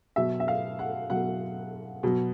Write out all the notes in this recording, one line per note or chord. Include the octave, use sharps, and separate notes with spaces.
B2 F#3 E5
E5
F5
F#5
B2 F#3 F#5
B2 F#3